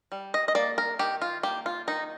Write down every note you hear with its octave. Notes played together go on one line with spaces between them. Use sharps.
G3
D#5
D#5
A#3 D5
A#4
D#3 G4
F4
A#3 G4
F4
D#3 D#4